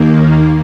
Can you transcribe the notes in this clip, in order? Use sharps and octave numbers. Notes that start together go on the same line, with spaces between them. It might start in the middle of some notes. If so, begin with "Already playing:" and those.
Already playing: D#2 D#3 A#3